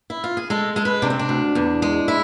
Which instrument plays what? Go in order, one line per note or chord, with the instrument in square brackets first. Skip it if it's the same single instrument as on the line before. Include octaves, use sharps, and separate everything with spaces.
[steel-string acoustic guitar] E4
F4
G#4
G#3 A4
G#3 A4
B4
C3 D4
C4
D4
D2
E2
G#3
E4